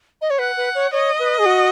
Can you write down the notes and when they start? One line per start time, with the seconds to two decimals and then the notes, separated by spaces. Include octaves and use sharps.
0.21 D#5
0.30 C#5
0.39 B4 F#5
0.57 B4
0.75 C#5
0.92 C#5 D#5
1.19 B4
1.39 G#4
1.46 F#4